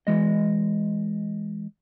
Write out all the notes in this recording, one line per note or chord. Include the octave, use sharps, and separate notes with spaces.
E3 G#3 D#5